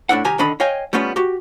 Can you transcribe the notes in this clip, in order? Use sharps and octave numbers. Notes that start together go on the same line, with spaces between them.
A2 D4 E4 F#5
C2 D#3 G4 G#5 A#5
D3 D#3 D4 D#5 B5
C#5 D#5 F5 G5 G#5
G3 A3 B3 C#4 F4
F#4 G4